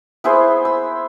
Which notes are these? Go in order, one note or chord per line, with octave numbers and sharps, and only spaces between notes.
B3 E4 G#4 C5
E6